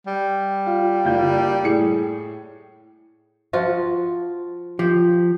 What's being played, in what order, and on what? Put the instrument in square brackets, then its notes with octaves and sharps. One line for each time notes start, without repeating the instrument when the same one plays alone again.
[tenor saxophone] G3
[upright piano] F4
F#1 F4 G6
A2 G#4 C#7
[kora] F3 F4 F#4
[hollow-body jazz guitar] F3 [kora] G4